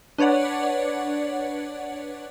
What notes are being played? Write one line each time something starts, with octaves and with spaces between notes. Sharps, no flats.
D4 B4 C#5 D5 F#5